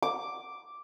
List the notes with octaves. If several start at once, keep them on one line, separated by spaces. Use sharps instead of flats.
D6